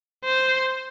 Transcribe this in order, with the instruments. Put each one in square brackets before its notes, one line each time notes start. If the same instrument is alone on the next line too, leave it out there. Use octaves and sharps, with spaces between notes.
[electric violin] C5